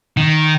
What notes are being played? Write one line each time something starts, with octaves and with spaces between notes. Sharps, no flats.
D#3